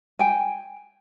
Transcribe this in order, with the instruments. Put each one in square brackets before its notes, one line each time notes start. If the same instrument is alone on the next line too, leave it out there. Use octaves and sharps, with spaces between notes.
[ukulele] G5 G#5